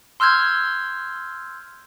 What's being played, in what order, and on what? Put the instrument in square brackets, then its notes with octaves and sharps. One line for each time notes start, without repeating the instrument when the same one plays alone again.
[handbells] C6 E6 F6 G6 G#6